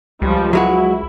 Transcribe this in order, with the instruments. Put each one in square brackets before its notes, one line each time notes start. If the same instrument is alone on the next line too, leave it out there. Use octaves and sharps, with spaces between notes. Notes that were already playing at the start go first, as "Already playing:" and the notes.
[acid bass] C#2 [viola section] F3 G3
[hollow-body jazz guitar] F#3 G#3 F#4 [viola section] E4